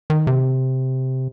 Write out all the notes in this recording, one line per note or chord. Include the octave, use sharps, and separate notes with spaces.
D#3
C3